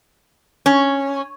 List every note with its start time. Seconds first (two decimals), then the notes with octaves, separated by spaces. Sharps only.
0.66 C#4